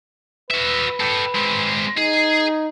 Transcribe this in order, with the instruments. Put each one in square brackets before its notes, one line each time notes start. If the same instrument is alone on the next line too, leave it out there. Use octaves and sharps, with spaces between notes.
[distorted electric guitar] F#4 E5 [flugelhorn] B4
[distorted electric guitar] A4 G5
G#3 C4
[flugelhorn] D#4 [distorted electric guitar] G#4